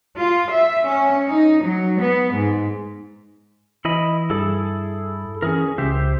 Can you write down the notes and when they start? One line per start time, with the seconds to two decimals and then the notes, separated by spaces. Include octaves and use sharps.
0.18 F4
0.51 E5
0.87 C#4
1.27 D#4
1.62 F#3
2.00 B3
2.33 G#2
3.85 E3 E4 D#5 B5
4.30 G2 E4 G#4 A4
5.42 E3 C#4 G#4 A#4
5.78 C#2 G4 C5 E5